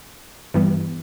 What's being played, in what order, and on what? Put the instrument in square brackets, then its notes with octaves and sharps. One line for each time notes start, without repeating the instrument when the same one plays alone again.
[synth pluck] G2 E3 G3 B3